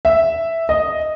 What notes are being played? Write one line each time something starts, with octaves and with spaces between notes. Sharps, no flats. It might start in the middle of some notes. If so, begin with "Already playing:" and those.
E5
D#5